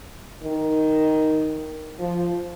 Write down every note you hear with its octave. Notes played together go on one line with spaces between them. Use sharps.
D#3
F3